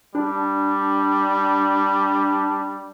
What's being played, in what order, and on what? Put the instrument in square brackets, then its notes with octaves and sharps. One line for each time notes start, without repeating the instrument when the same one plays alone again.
[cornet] G3 [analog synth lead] D4